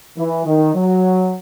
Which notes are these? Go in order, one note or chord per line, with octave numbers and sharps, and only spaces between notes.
E3
D#3
F#3